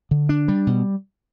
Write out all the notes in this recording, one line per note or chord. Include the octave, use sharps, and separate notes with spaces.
D3
D4
G3
B2